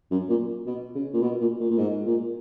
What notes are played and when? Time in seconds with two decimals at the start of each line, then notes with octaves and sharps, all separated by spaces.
0.11 F#2
0.29 A#2
0.66 B2
0.95 C#3
1.14 A#2
1.23 B2
1.41 A#2
1.60 A#2
1.71 A#2
1.78 G#2
2.06 A#2